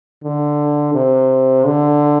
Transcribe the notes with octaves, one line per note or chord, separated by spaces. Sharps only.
D3
C3
D3